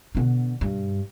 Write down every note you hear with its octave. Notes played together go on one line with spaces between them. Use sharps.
B2 D3
G2